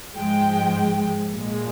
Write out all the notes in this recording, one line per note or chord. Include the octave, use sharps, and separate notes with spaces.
G#2 F3 G#3 G5
A#2 G#3